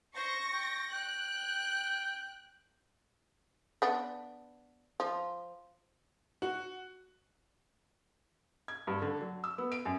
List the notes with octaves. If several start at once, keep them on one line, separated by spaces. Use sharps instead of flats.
C5 C#6 A#6
G5
G5 F#6
B3 D4
F3
F#4
G#6
G2
D3
F#3
E6
B3
D7
F#2